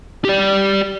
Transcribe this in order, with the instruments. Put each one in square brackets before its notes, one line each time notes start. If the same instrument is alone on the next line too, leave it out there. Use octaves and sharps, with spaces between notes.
[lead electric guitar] G4 D5